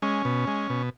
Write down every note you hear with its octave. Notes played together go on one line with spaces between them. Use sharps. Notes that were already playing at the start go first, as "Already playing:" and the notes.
G#3 C#4
B2
G#3
B2